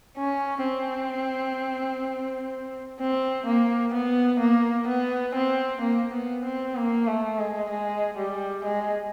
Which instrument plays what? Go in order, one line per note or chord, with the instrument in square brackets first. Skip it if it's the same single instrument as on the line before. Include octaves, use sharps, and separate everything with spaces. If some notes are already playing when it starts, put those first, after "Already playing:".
[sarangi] C#4
C4
C4
A#3
B3
A#3
B3
C4
A#3
B3
C4
A#3
A3
G#3
G#3
G3
G#3